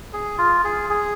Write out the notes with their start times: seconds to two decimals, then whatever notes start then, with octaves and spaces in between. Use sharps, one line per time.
0.13 G#4
0.38 F4
0.64 G#4
0.90 G#4